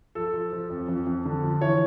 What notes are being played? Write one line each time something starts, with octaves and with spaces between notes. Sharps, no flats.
F3 A4
F3
F3
F2
F2
F2
D3
F3
E3 C#5